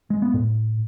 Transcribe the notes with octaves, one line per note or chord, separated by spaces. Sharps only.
G#3
B3
A2